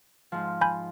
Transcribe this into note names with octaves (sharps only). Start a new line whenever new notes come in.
G#2 F3
G#5 B5 G6